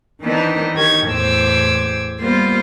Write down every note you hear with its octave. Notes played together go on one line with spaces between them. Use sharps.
D#3 E3 B3 C4 D4 D#4
D#3 G4 C#5 G#6
E2 A2 C5 D6 E6 G#6
G3 A#3 B3 F4 C5